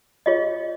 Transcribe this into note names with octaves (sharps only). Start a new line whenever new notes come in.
F4 G#4 C#5 D#5